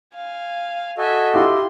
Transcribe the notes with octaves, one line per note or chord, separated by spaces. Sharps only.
F5 G#5
F#4 A4 D#5 E5 G#5
E4 F4 G4 C6